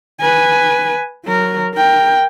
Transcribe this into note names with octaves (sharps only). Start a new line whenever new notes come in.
B4 G#5
F#3 A#4
A#4 G5